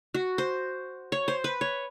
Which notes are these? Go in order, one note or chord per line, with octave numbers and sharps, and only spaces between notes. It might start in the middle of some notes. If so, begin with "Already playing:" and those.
F#4
C5
C#5
C5
B4
C#5